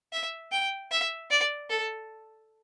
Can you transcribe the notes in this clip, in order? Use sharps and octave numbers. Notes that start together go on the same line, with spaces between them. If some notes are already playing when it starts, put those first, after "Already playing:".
E5
G5
E5
D5
A4